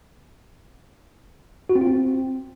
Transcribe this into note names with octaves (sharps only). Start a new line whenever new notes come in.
F#4
C4
F4
C4